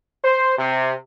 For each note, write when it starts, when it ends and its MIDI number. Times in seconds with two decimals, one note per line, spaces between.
0.24 0.55 72
0.58 0.93 48